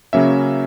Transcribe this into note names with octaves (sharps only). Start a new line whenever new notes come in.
C#3 F#3 A#3 C#4 E5